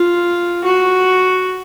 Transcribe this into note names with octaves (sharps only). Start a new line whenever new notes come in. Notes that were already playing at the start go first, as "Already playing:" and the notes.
Already playing: F4
F#4